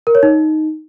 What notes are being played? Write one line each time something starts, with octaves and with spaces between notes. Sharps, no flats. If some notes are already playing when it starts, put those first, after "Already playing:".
A#4
C#5
D#4